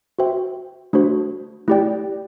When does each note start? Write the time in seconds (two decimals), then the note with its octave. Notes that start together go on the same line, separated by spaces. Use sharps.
0.19 F#4 C5 E5 G5
0.93 A3 D4 F#4 C5
1.68 A3 E4 G4 D5 G5